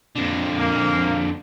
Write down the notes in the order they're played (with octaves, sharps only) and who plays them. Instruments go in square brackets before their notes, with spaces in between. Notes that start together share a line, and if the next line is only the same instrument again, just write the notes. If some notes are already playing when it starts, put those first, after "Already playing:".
[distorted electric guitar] F2 D3
[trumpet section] A#3